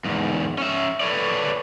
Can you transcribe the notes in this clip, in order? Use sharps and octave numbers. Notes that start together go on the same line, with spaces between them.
E2 G#2
C#4 E5
A4 B4 C#5 D5